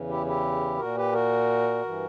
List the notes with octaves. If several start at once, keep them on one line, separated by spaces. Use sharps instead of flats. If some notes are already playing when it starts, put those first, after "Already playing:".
Already playing: E2 C#3 E3
E4 G4
E4 G4
A#2 F#4 A#4
G4 B4
F#4 A#4
G2 E3